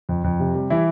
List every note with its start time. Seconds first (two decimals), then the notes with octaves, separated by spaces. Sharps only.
0.09 F2
0.24 F2
0.40 C3
0.55 G3
0.70 E3 E4